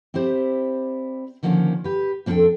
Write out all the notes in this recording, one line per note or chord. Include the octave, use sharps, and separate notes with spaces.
C4 E4 G4 C5 D5
D3 D#3 F3 A#3 C4 C#4
G4 B4
F2 C4 D4 G#4 A4 G5